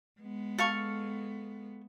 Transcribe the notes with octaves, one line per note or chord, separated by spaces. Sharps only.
G#3 B3
A4 F5 C#6